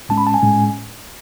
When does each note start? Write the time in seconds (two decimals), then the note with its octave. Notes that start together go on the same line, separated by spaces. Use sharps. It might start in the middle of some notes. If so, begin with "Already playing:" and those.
0.09 A2 G#3 C#4 A5
0.18 B5
0.27 A5
0.34 G#5
0.42 A2 G#3 C#4